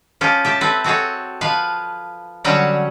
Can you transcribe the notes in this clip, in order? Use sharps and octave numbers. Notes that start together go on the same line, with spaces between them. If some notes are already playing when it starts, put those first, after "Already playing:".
F3 C#4 F4 G4
G4 E5 A5
C4 A4 B4
C4 F#4 G#4 A4 C#5
F3 B4 F5
D3 F#3 G3 C#4 F#4 C#5